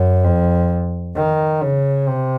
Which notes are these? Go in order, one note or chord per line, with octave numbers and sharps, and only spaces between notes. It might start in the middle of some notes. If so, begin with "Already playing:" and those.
Already playing: F#2
F2
D#3
C#3
C3